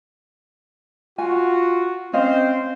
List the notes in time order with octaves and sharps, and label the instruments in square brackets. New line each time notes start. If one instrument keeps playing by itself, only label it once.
[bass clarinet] F4 [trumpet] F#4 [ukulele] G#5
[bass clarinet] C4 [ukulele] C#4 D#5 F5 [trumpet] C5